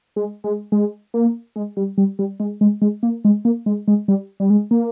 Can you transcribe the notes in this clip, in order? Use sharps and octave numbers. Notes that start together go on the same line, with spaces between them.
G#3
G#3
G#3
A#3
G#3
G3
G3
G3
G#3
G#3
G#3
A#3
G#3
A#3
G#3
G#3
G3
G3
G#3
A#3